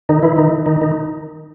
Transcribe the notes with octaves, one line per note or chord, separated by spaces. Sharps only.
D#3 D#4
E3 E4
D#3 D#4
D#3 D#4
D#3 D#4